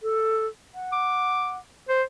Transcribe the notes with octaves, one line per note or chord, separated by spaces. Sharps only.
A4
F#5
D6
C5